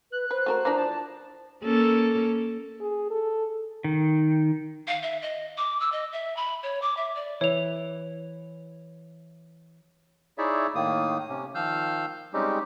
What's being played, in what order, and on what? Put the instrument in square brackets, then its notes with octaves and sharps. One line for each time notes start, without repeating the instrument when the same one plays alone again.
[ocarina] B4 [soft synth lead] F#6
[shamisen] B4 [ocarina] C5
[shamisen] A3 F#4 A#4
[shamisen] E3 F3 D4 [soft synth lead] A#5
[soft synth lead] A5
[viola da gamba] A#3 C#4 A4
[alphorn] G#4
A4
[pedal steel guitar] D#3
[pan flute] F5
E5
D#5
D6
E6
D#5
E5
B5
C#5
D6
E5
D5
[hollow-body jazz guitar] E3 [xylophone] C#5 F7
[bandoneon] D#4 E4 G#4 C#5 D5 E5
A2 D#3 A#3 D#6
C3 C#4
D#3 F3 F5 E6 F6 G6
G3 G#3 C4 C#4 D#4 G4